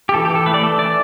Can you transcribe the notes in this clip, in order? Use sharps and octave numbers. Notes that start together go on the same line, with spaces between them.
G4
E3 A4
G4
E3
A4
A3 B4
D5
A3 A4
E3 D5